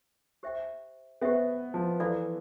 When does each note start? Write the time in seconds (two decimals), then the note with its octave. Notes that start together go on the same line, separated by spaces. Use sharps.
0.43 G4 C5 E5 G5
1.21 B3 G4 C5 E5 G5
1.74 F3
2.00 E3 E4 A4 D5 F5 B5